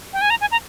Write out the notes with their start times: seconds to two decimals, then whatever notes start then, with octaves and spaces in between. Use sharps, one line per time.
0.13 G5
0.21 G#5
0.30 A#5
0.41 G#5
0.51 A#5